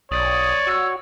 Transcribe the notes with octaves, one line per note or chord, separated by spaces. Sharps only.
B1 C#5 D5 D#6
F#4 E6